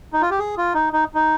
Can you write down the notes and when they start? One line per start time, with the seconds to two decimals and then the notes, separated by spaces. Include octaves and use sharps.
0.13 D#4
0.21 F4
0.31 G4
0.39 G#4
0.57 F4
0.74 D#4
0.93 D#4
1.15 D#4